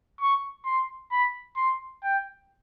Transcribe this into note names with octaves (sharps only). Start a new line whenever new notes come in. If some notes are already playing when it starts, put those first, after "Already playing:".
C#6
C6
B5
C6
G5